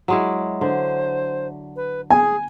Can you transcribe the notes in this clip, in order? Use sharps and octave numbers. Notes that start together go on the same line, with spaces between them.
F#3 G#3 E4
D3 C5
B4
G#4 G#5